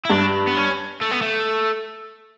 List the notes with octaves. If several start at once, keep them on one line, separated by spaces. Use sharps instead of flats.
E4
G2 D4
B3
C#4
A3
B3
A3